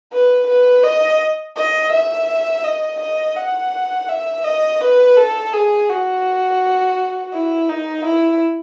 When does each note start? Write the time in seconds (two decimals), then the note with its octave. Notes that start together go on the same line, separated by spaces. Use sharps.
0.12 B4
0.48 B4
0.84 D#5
1.56 D#5
1.92 E5
2.64 D#5
3.00 D#5
3.37 F#5
4.09 E5
4.44 D#5
4.81 B4
5.17 A4
5.54 G#4
5.90 F#4
7.33 E4
7.69 D#4
8.05 E4